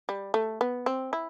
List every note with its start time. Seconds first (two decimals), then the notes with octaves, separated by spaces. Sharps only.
0.09 G3
0.34 A3
0.61 B3
0.86 C4
1.13 E4